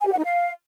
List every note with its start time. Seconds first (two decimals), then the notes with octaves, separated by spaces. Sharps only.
0.01 G#5
0.07 G4
0.12 F#5
0.18 D#4
0.24 F5